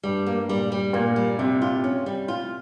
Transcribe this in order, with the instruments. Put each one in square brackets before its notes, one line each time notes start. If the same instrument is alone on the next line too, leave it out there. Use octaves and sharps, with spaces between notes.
[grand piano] G2 [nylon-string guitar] G3
[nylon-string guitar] A#3
[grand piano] A#2 [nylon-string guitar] G3
[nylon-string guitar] G3
[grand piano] A#2 [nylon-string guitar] A#3
[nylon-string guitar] G3
[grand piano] C3 [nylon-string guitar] G3
[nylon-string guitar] F4
[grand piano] C3 [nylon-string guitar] C#4
[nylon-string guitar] G3
F4